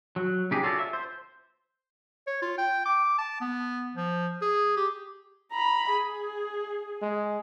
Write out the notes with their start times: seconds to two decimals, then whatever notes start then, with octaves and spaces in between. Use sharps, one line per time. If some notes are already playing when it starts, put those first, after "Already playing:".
0.16 F#3
0.51 C#3 D#4 G4 G#4
0.63 F4 F#4 A4 C#5 D5
0.79 E5
0.93 C5
2.27 C#5
2.42 F4
2.58 G5
2.86 D6
3.18 A5
3.41 B3
3.95 F3
4.42 G#4
4.76 G4
5.52 A#5 B5
5.92 G#4
7.02 G#3